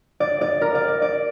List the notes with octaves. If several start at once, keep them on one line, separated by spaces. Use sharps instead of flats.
D5
D5
A#4
D5
D5
D5